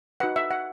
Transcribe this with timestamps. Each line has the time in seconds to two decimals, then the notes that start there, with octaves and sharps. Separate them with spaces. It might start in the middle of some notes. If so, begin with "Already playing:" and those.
0.20 D#4 F#4 B4 F#5
0.36 E5
0.51 F#5